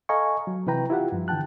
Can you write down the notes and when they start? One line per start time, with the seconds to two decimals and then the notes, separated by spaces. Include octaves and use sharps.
0.09 A4 D#5 F5 G#5 A#5 C#6
0.47 F#3
0.67 C3 E3 E4 B4 G5 A#5
0.90 E4 F4 G4 F#5
1.12 G2 F3
1.28 D3 E3 G5 A5 F#6